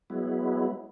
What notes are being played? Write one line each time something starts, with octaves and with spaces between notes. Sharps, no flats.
F#3 G#3 B3 E4